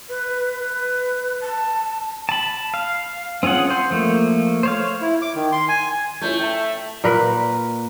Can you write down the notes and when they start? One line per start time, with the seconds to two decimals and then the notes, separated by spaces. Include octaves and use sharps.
0.09 B4
0.60 B4
1.41 A5
2.29 A5 B5
2.74 F5
3.43 C4 C#4 F4 G#4 F#5
3.70 C5
3.91 F3 A3 A#3
4.63 C5 C#5 F5
5.01 E4
5.22 D6
5.35 D#3
5.52 C6
5.68 G#5
6.21 F3 A3 C#4 E4 G6
6.39 E5 G5 A5
7.04 A#2 A#4 B4